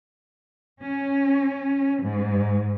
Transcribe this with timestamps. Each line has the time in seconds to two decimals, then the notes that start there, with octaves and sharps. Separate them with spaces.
0.82 C#4
2.01 G#2